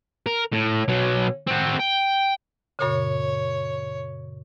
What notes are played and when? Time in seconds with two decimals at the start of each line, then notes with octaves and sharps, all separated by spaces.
0.26 A#4
0.52 A2
0.88 B2 F#3
1.47 C4 F#4
1.79 G5
2.79 F#2 A#2 C#3 C#5